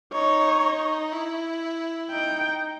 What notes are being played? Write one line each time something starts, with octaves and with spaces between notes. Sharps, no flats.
D#4 C#5
D#4
E4
D#4 G5